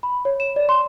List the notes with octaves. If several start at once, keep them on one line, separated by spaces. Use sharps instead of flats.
B5
C#5
E7
D5
C6